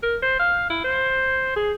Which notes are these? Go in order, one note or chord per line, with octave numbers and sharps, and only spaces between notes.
A#4
C5
F5
E4
C5
G#4